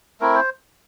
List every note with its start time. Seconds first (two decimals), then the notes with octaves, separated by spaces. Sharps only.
0.20 A3 C4 E4 A#4
0.35 C5